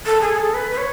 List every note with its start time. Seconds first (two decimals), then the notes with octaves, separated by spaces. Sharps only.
0.06 A4
0.21 G#4
0.38 A4
0.54 B4
0.71 B4
0.77 C#5